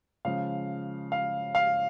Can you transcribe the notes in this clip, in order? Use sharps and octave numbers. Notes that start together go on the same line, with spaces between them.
C#3 F3 G#3 F5
F5
F5